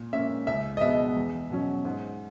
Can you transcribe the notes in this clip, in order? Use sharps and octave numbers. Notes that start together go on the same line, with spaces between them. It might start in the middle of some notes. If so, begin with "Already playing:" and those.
Already playing: A#2
A#3 C#4 E5
C#2 E5
D#5
B2 G#3 B3 E5
E2
B2 F#3 C#4
G#2